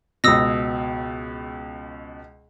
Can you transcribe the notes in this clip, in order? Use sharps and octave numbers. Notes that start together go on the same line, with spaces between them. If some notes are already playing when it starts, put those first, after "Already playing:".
C#2 B2 D#6 E6 A#6